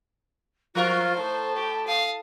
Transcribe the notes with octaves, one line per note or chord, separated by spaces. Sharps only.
F3 F4 A#4 C5
A2 A5
G4
F5 D#6